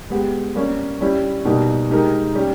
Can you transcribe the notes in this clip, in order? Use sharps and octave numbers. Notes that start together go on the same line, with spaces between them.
G#3 B3 G4
G3 A#3 C#4
G3 C#4 E4 G4
B2 G3 A#3 D#4 G4
G#3 D#4 G4 A#4
G3 C#4 G4